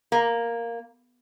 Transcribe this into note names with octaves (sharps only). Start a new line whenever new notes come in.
A#3